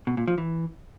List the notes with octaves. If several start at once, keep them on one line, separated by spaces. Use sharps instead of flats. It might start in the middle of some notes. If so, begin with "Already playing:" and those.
B2
A#2
F3
E3